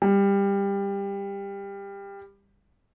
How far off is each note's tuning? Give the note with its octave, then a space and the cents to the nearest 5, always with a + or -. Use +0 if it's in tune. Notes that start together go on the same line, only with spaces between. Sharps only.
G3 +20